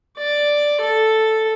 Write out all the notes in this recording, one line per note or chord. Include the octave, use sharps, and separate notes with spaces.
D5
A4